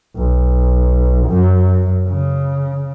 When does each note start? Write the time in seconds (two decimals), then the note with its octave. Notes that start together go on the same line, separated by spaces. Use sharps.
0.16 B1
1.27 F#2
2.07 C#3